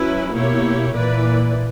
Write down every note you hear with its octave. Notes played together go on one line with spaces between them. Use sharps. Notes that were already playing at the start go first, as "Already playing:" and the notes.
Already playing: F#3 C#4 E4 B4
B2 A#3 E4 G4 C#5
A#2 E3 A#3 E4 B4 D5